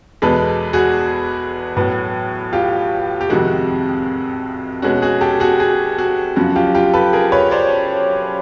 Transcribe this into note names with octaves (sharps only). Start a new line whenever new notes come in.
E2 B2 G#3 B3 A4 B4
F#4 G#4
A2 F#3 B3
F4 G4
G4
F2 C3 D#3 G#3 F#4
B2 G#3 C#4 F#4
F#4 G#4
G4 A4
F#4 G#4
F#4 G#4
F#4 G#4
F#2 C#3 F3 F#4
F4 G4
F4 G4
A4 B4
G#4 A#4
B4 C#5
C5 D5